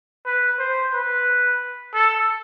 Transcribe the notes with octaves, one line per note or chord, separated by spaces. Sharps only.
B4
C5
B4
A4